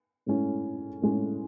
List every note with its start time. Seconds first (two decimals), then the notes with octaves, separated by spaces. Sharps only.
0.26 A2 G#3 C#4 E4
1.02 A2 G#3 C#4 E4